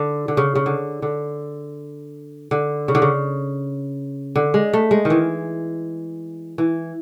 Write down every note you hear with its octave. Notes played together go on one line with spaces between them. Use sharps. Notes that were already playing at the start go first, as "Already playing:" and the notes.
Already playing: D3
D3
C#3
C#3
D3
D3
D3
C#3
D3
C#3
D3
G#3
A3
G#3
D#3
E3
E3